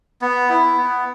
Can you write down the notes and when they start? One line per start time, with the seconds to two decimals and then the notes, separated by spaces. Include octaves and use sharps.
0.22 B3
0.50 E4
0.77 B3